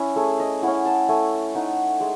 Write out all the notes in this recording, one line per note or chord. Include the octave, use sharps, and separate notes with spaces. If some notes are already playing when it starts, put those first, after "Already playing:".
Already playing: C#4 E4
A3 G#4
D#5
C#4 E4 F#5
A5
A3 G#5
D#4 F#5
G#3